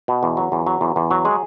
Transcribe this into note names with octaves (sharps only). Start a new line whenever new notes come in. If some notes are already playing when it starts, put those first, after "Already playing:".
B2
E2
F#3
E2
F#3
E2
E2
F#3
G#3 G#4